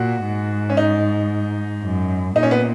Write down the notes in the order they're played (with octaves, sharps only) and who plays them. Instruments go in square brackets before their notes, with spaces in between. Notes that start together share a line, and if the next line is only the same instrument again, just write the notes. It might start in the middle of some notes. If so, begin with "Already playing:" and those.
Already playing: [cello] A#2 [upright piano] F#4
[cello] G#2
[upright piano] C#4
D#4
[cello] F#2
[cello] A#2 [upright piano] D#4
[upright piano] C#4
B3